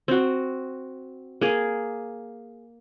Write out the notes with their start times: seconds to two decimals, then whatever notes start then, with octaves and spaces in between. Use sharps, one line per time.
0.08 C4 F#4
1.41 A#3 G#4